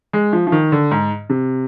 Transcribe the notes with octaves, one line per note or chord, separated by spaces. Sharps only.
G#3
F3
F3
D#3
D3
G#2
C3